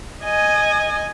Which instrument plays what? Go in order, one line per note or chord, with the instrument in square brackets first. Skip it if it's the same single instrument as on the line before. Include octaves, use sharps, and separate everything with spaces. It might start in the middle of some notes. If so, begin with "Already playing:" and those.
[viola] D#5 G#5